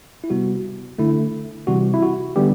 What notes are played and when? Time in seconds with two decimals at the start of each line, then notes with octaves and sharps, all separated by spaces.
0.24 E4
0.30 C3 G3 B3 F#4
0.98 D3 A3 E4
1.67 C3 E3 G3 F#4
1.94 E4
2.03 F#4
2.36 D3 G3 B3 G4